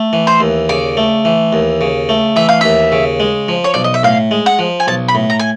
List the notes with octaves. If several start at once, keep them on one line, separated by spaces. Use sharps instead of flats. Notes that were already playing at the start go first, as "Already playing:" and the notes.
Already playing: A3
E3
C5
D#2
C#3 D5
A3
E3
D#2
C#3
A3
E3 E5
F5
D#2 E5
C#3
G#3
F3
C#5
B1 D5
D#5
E5
A2 F5
G#3
F#5
F3
G#5
B1 A5
B5
A2
A#5
G#5